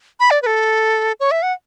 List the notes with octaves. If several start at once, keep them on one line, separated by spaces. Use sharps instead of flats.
B5
D5
B4
A4
C#5
E5
F#5